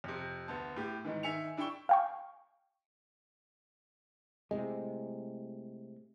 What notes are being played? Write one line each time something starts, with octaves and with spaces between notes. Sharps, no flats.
F2 C3
D2 B3 A5
A2 G4
G#2 D#3 E3
D#3 E5 G#5 C#7 F7
D4 E4 G5 C#6 G7
F5 G5 C#6
A2 C3 G#3